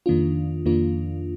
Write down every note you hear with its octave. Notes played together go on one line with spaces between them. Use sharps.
F2 D#3 A#3 D4 F4
F2 D#3 A#3 D4 F4